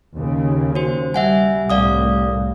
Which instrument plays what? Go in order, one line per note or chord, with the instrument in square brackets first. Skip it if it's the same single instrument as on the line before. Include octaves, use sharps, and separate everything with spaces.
[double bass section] D#2 C#3
[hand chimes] F#4 C5
[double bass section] G3 [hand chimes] E5 F#5 G#5
[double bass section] C2 A2 [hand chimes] D5 F5 D#6